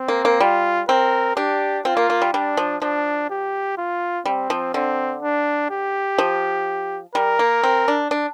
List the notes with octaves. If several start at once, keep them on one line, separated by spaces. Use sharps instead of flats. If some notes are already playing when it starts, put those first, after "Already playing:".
Already playing: C4
A#3
A#3
G3 F4
C4 A#4
D4 G4
C4 F4
A#3
A#3
G3
G3 D4
F3
F3 D4
G4
F4
G3 C4
F3
D3 C4
D4
G4
F3
G3 A#4
A#3
C4
D4
D4